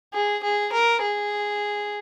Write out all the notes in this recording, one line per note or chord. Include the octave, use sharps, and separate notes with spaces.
G#4
G#4
A#4
G#4